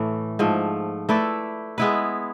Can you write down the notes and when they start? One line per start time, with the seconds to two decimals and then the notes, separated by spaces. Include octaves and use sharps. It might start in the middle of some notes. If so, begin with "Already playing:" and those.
Already playing: A2 E3 A3
0.39 G#2 F3 A3
1.09 A3 E4 B4 D5
1.78 G#3 B3 E4 B4